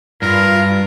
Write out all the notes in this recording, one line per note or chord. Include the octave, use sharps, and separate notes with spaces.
G2 F4 A#4